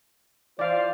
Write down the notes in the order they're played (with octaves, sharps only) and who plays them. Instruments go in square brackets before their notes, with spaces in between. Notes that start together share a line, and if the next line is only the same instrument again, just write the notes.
[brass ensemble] E3 F4 C5 [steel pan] D5 F5